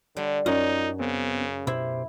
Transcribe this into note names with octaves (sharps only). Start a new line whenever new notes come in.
D3 G3
F#2 D#4 F4 C#5 D5
C#3 B3 C4
B2 E4 G4 C5